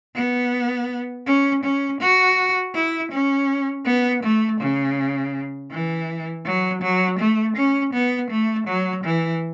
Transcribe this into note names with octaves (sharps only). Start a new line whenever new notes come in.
B3
C#4
C#4
F#4
E4
C#4
B3
A3
C#3
E3
F#3
F#3
A3
C#4
B3
A3
F#3
E3